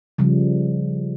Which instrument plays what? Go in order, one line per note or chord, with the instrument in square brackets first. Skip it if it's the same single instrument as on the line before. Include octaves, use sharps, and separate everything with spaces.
[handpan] C#3 F3 G3